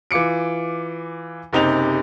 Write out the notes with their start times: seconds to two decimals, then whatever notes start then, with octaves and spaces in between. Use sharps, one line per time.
0.11 E3 F4 D6 C#7 D7
1.53 F#1 C3 D#4 G4 F7